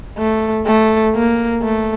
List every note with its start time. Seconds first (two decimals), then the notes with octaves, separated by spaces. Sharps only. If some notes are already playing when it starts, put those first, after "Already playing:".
0.18 A3
0.66 A3
1.15 A#3
1.63 A3